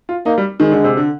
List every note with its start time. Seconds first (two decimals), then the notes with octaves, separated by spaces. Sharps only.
0.09 F4
0.26 A#3 D#4
0.38 G3
0.60 D#3 G#3
0.72 D3
0.84 C3
0.97 D3